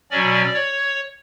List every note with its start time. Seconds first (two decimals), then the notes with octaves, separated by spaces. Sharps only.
0.10 B2 F#3 C#4 D5
0.54 C#5